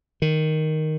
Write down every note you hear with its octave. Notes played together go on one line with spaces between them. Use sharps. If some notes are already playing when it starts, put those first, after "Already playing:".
D#3